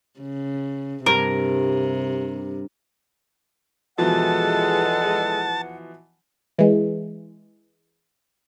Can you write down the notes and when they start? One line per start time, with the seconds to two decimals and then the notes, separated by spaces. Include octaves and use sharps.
0.20 C#3
1.06 G2 C3 A#4
3.98 E2 B2 E3 F3 G#3 A4 F#5 A5
6.58 E3 G#3